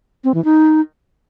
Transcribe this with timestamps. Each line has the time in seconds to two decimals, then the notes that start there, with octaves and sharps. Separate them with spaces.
0.24 C4
0.34 E3
0.45 D#4